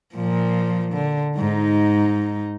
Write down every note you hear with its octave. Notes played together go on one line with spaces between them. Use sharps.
A#2 F3
D3
G#2 D#4